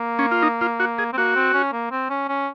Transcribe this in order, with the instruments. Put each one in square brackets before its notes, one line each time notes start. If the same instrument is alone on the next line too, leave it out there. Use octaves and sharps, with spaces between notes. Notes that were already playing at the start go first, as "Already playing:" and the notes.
Already playing: [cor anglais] A#3
[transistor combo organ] C#4
F4
D#4
F4
F#4
G#4
[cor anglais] C4
[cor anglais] A#3 [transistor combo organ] F#4
[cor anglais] C4
C#4
A#3
C4
C#4
C#4